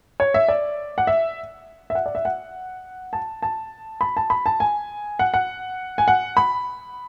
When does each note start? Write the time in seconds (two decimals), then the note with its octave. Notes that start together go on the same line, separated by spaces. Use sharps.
0.20 C#5
0.34 E5
0.48 D5
0.98 F#5
1.07 E5
1.90 E5
1.95 F#5
2.06 D5
2.15 E5
2.25 F#5
3.13 A5
3.42 A5
4.01 B5
4.17 A5
4.30 B5
4.46 A5
4.60 G#5
5.19 F#5
5.34 F#5
5.98 G#5
6.08 F#5
6.37 B5